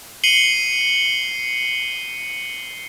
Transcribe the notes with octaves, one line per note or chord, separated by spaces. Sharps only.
C7 C#7 D#7 F#7 G7